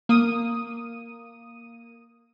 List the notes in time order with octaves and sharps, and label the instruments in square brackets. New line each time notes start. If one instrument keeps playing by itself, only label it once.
[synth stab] A#3 D#6 D#7